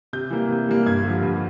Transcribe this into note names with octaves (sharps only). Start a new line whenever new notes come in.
C3 G6
E3 G3 A#3
C3
E3 G3 A#3
G2 G#6
D3 F3
G2